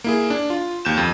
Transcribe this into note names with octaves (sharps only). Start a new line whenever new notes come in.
A#3 E4 G#4
D4
F4
D#2 G6 E7
F2